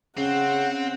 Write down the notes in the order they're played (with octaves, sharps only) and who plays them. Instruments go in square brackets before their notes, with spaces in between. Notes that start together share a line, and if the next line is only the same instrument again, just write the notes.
[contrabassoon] C#3 [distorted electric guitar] C4 [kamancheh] F#5